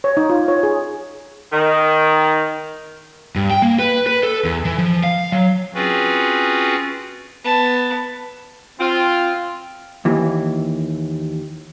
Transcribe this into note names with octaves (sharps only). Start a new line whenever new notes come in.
C#5
D#4
F4
C#5
G#4
D#3
G2
G5
A#3
B4
B4
A4
E2
E3
F3
F5
F#3
C4 C#4 F4 F#4 G#4 B4
B3 A5
C4 F4
D#2 E3